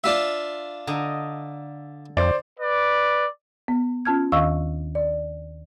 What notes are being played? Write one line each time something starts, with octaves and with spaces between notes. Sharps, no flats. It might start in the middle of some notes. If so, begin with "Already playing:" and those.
D4 F4 E5
D3 D#5 A#5
F2 C5 D5
B4 D5
B3
C#4 F4 A5 F6 G#6
D#2 D#3 D#5 F5 C#6 E6
D5